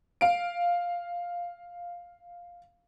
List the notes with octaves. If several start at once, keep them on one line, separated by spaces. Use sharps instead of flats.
F5 D7